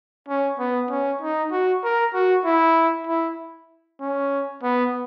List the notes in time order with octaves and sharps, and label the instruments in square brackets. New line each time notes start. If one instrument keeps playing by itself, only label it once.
[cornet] C#4
B3
C#4
D#4
F#4
A#4
F#4
E4
E4
C#4
B3